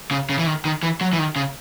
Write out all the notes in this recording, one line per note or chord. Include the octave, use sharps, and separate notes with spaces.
C#3
C#3
E3
D#3
D#3
E3
F#3
E3
D#3
C#3